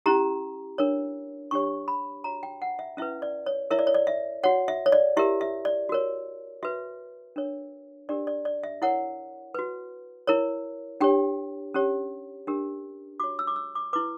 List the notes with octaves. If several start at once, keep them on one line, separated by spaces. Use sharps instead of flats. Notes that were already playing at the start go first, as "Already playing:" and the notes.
C#4 E4 G4 A#5
D4 A#4 C#5
D4 G4 C#5 C#6
B5
F#4 C#5 A#5
G5
F#5
E5
C#4 E4 B4 E5
D5
C#5
E4 A#4 C#5 E5
D5
C#5
D5
E5
F#4 C#5 F#5
E5
C#5
D5
E4 G4 A#4 E5
E5
D5
F#4 A#4 C#5
F#4 B4 E5
D4 A#4 C#5
D4 G4 A#4 D5
D5
D5
E5
E4 A#4 C#5 F#5
F#4 B4
E4 A#4 C#5
D4 G4 C#5 G5
C#4 G4 C#5
D4 G4 A#4
F#4 C#5 D6
E6
D6
E6
D6
E4 B4 D6